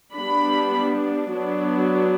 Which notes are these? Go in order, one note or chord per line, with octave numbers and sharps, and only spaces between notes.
G3 B3 D4 B5
F#3 B3 D4